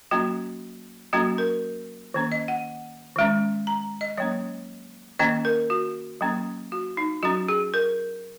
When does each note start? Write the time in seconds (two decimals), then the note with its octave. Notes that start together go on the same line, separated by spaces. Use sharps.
0.11 F#3 A#3 C#4 F#4
1.13 F#3 A#3 C#4 F#4
1.38 A#4
2.14 D#3 A#3 C#4
2.32 D#5
2.48 F#5
3.16 D#3 G#3 C#4
3.67 A#5
4.01 D#5
4.17 F#3 A#3 C#4 C#5
5.19 D#3 A#3 C#4 D#5
5.45 A#4
5.70 F#4
6.21 F#3 A#3 C#4
6.72 F#4
6.97 D#4
7.23 F#3 C#4 F#4
7.48 G#4
7.74 A#4